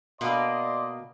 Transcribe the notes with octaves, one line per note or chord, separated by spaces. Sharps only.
B2 A#3 D5 D#5 C6